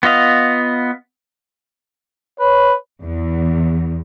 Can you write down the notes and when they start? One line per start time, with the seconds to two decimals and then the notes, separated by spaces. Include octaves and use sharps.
0.03 B3 F4 D#5 F5
2.40 B4 C#5
3.03 E2